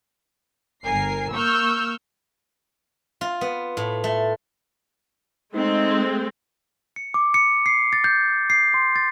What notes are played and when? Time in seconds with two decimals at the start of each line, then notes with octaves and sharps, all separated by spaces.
0.83 G1 A#4 G#5 C7
1.33 A#3 C#6 E6 F6 G6
3.21 F4
3.41 B3
3.77 A2
4.04 A3
5.55 G#3 A3 C4 D#4
6.96 C#7
7.14 D6
7.34 C#7
7.66 C7
7.93 A6
8.04 G6
8.50 C7
8.74 C6
8.96 A6